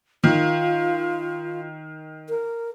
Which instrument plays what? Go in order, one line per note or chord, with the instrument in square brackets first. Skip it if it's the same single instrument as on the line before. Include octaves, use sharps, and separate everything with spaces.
[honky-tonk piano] D#3 [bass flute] F4
[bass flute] A#4